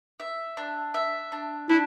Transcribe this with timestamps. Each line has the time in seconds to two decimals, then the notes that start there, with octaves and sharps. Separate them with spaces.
0.20 E5
0.57 D4
0.94 E5
1.32 D4
1.69 D4 E4